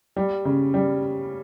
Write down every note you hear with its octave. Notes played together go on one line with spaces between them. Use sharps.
G3
C#3
G3